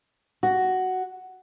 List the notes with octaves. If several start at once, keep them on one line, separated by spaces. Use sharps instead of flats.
F#4